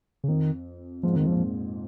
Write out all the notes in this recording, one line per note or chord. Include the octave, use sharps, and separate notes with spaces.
C#3
F2 D#3
G#2 F3
F2 D#3
G#2
F2 A#2 F3